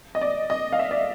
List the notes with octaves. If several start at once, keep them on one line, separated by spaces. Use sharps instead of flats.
D#5
D5
D#5
F5
E5
D5